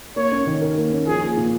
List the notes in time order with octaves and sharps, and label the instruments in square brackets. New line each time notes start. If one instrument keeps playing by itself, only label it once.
[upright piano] A#3 [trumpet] C#5
[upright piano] C#4
D#3
A#4
A#3
C#4
[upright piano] F3 [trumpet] G#4
[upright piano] A#3
A#2